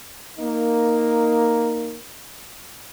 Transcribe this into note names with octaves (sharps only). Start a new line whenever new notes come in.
A#3 D#4